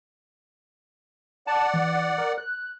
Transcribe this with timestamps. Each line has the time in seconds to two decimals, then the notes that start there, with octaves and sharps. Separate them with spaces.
1.47 D5 F#5 A5
1.74 E3
2.18 A#4
2.38 F#6